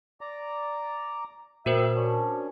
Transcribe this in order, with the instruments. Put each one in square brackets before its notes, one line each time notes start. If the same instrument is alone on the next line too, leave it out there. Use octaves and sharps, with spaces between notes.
[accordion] D5 A#5
[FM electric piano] A#2 [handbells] F#4 A#4 C5 [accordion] E5 G5
[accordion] C#4 D4